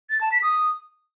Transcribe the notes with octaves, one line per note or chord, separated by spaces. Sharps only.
A6
A5
B6
D#6